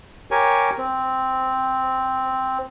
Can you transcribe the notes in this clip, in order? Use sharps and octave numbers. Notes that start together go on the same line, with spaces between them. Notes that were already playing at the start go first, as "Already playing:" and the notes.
G4 A#4 C#5 G#5
C4